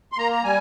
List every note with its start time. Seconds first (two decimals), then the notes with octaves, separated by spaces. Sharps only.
0.12 C6
0.18 A#3 A#5
0.32 A#5
0.44 G3 G#5